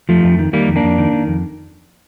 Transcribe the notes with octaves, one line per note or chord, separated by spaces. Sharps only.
F2 F3 A3
F2
D#3
D#3 G3 A#3
F2
A#3 D4
F2
D#3
D#3
F2